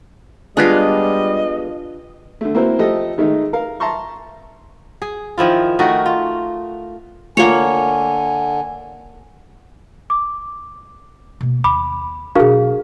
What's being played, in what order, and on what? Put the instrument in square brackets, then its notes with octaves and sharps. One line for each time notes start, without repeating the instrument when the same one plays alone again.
[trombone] G3 [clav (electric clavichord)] G#3 B3 [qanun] D4 F4 F5 [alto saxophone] D#5
[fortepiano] D3 A3
A#3 C4 E4 F#4 A#4 C5
F3 A3 G4 A4 D#5
D#3 G#3 A3 D#4
A#4 F5
E5 A5 A#5 C6 C#6
[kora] G#4
D#3 F3 E4 F4
D#3 A3 F#4 A#4
F4
[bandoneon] D3 [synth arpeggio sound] A3 F4 [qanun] A#3 C#5 [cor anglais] G#5
[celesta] D6
[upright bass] B2 A#3
[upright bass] D#2 [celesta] B5 [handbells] D6
[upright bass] B2 F#3 [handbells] D4 F#4 A#4 [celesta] G#4 F5